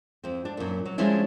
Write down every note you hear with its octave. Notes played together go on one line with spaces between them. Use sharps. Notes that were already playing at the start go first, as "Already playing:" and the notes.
F2 C4
D4
F#2 A#2
F#3
F3 G3 G#3 C#4 D4 E4